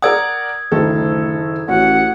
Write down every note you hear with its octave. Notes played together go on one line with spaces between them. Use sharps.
A#4 D5 F#5 D#6 E6 G#6
F#1 D2 D#3 A4
A1 C#4 F#4 F#5